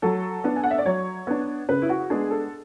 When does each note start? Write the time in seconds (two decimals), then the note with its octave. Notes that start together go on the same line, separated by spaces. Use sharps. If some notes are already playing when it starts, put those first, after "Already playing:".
0.02 F#3 A4
0.44 B3 D4
0.56 G#5
0.63 F#5
0.71 E5
0.78 D5
0.85 F#3 C#5
1.27 B3 D4
1.69 C#3 B4
1.82 E4
1.89 F#4
2.10 G#3 B3 D4 G#4
2.31 A4